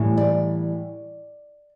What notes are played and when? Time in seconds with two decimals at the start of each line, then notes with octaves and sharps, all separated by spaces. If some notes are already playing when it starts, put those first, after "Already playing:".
Already playing: A2 E3 G3
0.17 D5